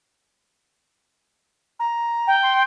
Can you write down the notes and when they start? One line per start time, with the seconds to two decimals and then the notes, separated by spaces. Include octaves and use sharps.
1.79 A#5
2.27 G5
2.43 C6